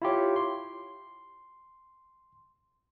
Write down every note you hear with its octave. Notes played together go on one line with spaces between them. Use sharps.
E4 F4 G4 C#5
C6